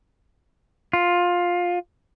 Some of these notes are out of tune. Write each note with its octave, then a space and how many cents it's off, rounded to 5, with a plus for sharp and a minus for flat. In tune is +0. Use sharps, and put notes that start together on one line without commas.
F4 +15